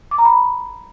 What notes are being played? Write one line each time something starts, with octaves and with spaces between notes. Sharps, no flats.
D6
A#5
B5